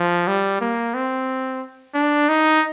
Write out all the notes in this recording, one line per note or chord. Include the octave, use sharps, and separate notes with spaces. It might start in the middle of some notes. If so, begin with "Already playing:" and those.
Already playing: F3
G3
A#3
C4
D4
D#4